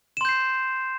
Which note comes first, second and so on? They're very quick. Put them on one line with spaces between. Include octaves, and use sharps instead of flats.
E7 C6 G6 C7